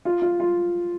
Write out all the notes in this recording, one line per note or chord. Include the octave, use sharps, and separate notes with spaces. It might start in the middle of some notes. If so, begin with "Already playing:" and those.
F4
F4
F4